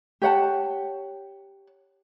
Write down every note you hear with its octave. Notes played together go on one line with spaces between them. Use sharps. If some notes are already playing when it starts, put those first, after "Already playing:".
G4 C#5 F#5 A5